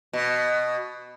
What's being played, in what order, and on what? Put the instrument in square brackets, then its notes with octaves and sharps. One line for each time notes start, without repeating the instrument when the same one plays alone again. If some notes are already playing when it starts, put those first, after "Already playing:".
[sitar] B2